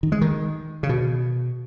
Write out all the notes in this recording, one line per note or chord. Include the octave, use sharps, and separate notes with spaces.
D#3
G#3
D#3
C#3
B2